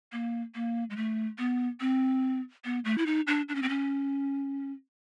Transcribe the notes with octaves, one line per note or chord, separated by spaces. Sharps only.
A#3
A#3
G#3
A3
B3
C4
B3
A3
E4
D#4
D4
D4
C#4
C4
C#4